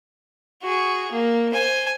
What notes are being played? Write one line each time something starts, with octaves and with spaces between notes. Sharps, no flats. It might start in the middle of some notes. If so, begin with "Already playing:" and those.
F#4 G#4
A#3
C5 G#5